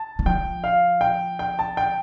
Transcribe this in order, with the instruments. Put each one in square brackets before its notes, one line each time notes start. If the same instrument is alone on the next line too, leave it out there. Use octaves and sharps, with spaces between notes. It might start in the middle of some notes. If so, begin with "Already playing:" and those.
Already playing: [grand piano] A5
[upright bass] D3
[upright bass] F3 [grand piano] G5
[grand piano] F5
G5
G5
A5
G5